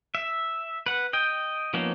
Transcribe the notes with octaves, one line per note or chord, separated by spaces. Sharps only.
E5
B4 F#5
D#5 G5
F3 A#3 B3 C#4 D#4